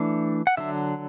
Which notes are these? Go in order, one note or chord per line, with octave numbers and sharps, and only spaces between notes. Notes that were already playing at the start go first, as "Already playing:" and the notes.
Already playing: E3 A3 D4
F#5
D3 F#3 D4 E5